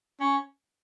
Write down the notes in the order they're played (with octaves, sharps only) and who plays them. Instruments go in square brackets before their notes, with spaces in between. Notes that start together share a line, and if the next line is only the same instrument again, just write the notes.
[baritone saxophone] C#4